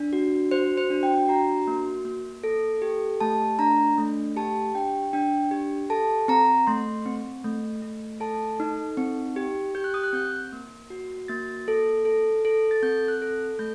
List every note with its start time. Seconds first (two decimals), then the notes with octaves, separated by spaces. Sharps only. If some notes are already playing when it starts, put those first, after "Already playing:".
Already playing: D4
0.13 F#4
0.51 F#4 C5
0.77 C5
0.90 D4
1.03 G5
1.28 F#4 A#5
1.67 A#3
2.05 A#3
2.44 A4
2.82 G4
3.20 A3 A5
3.59 D4 A#5
3.98 A3
4.36 G4 A5
4.75 D4 G5
5.13 D4 G5
5.51 G4
5.90 A4 A5
6.28 C4 A#5
6.67 A3 C6
7.06 C4
7.44 A3
7.82 A3
8.20 A4 A5
8.60 D#4
8.97 C4
9.36 G4
9.75 G4 G6
9.84 F#6
9.94 D#6
10.03 F#6
10.13 C4 G6
10.52 A#3
10.90 F#4
11.28 A#3 A6
11.68 A4
12.05 A4
12.45 A4
12.71 A6
12.82 C4 G6
13.08 F#6
13.22 A4
13.59 A3 G6